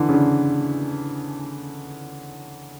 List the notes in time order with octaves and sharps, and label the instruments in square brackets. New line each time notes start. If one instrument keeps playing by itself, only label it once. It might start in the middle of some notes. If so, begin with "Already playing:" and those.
Already playing: [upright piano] D3 E3
C#3
D3